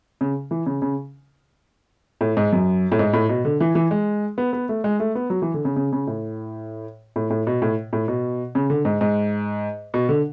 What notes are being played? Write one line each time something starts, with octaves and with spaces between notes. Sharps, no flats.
C#3
E3
C#3
C#3
A2
G#2
F#2
A2
G#2
A2
B2
D3
E3
E3
G#3
B3
B3
A3
G#3
A3
B3
F#3
E3
D3
C#3
C#3
C#3
A2
A2
A2
B2
A2
A2
B2
C#3
D3
G#2
G#2
B2
D3